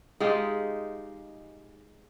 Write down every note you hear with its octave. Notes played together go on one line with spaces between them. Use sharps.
G#3 D#4 F4 G4